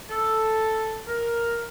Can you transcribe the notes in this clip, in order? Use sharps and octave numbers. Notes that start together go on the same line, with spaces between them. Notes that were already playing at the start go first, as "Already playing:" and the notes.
A4
A#4